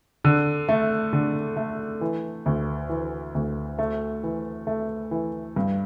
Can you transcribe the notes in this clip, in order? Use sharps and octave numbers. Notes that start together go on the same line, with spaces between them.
D3
A3
D3
A3
E3
D2
E3
D2
A3
E3
A3
E3
G2